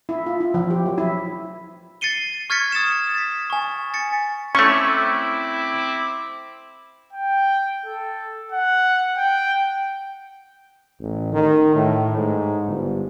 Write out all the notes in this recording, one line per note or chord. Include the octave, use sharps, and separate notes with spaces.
E4
F4
E4
F3
G4
F#3
E4
A6 C7 C#7 D#7 G7
C#6 F6 G#6 A6 B6 C#7
D#6 A6 C#7 E7
A6 B6
G#5 C#6
A6 C#7
A3 C4 C#4 E4 C#6 D6
G5
A4
F#5
G5
A1
D#3
A2
G#2
G1